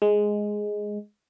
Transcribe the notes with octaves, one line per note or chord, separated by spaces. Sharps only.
G#3